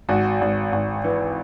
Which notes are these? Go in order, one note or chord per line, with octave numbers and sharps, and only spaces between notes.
G#1 F#4
G#1
G#1
E3